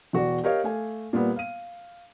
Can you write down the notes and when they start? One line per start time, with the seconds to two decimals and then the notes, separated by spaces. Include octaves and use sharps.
0.13 E1 F#4 D5
0.44 G4 A#4 C#5 D#5 F5
0.64 A3 F5 G#5
1.13 A#2 G3 B3
1.36 F5 D#7